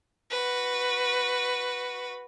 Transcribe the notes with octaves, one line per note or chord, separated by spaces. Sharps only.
F#4 B4